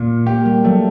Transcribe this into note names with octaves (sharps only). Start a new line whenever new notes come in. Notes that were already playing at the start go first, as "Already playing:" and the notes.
Already playing: A#2
A#3 G4
G3
F#3 A3